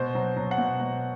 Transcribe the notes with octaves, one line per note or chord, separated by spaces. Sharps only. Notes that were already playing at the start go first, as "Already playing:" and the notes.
Already playing: B2 C5
F#3
F#3
F#5
B2
B2